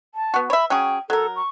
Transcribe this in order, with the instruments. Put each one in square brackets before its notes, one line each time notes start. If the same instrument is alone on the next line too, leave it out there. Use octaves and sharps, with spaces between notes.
[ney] A5
[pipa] B3 F#4
[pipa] C#5 E5 [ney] B5
[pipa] F#3 C#4 G#4 [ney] G5
[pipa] F#3 A#4 [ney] A4
[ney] C#6